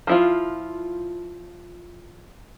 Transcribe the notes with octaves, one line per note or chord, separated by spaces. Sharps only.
F3 E4 F4